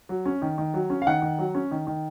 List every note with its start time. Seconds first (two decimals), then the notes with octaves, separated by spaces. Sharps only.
0.09 F#3
0.26 C#4
0.42 D#3
0.58 D#3
0.74 F#3
0.90 C#4
1.02 F5
1.07 D#3 F#5
1.22 D#3
1.39 F#3
1.55 C#4
1.71 D#3
1.87 D#3